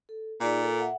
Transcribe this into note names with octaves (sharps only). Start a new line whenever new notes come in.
A4
A#2 D#4 G#4 D5
A4
E5 F#5